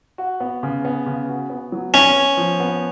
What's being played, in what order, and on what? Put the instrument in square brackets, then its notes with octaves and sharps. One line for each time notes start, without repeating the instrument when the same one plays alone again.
[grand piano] F#4
B3
C#3
B3
C#3
F#4
B3
F#3
[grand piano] B3 [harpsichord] C#4
[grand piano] B3
F3
B3